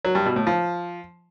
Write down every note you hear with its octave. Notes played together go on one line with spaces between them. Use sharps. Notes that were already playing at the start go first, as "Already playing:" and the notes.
F#3
G2
B2
A2
F3